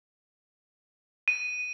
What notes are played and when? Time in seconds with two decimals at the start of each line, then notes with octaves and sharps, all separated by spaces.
1.28 D#7